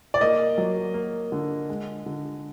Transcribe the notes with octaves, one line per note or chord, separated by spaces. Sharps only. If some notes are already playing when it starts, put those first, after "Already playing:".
D5
A#3 D#5
F#3
A#3
D3
G#3
D3